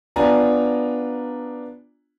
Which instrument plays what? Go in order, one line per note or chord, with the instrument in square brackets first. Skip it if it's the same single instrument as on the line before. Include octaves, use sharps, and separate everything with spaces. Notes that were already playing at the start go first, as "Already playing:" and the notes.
[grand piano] B3 D4 F4 G#5 A#5